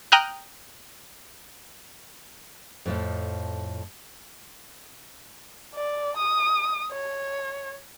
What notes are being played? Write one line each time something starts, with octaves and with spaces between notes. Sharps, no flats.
G5 A#5 D#6 F6 F#6
F2 A2 F3
D5
D#6
C#5